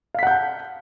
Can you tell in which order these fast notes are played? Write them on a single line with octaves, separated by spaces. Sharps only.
F5 B6 F#5 G6 A5